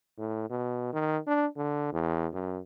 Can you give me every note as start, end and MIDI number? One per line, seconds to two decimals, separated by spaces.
0.18 0.49 45
0.50 0.90 47
0.93 1.18 51
1.27 1.46 62
1.57 1.89 50
1.93 2.27 40
2.33 2.59 42